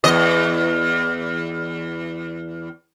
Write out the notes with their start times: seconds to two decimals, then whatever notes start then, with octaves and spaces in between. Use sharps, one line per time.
0.04 E2 D#5